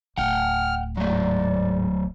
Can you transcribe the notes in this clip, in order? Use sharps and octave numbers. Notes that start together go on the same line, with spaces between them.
D1 F#5 G5 F6
G#2 F#3 A3 D5